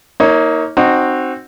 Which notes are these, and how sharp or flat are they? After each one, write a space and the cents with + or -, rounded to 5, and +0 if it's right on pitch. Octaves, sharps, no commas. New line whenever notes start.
A#3 +0 D#4 +30 C#5 -10
C4 +10 D#4 -20 F#4 +0